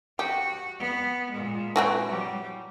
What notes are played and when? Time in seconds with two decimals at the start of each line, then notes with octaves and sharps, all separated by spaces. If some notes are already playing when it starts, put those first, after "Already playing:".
0.19 F#4 G4
0.80 B3
1.31 A#2 G#3
1.76 E3 F#3 C4
2.09 G3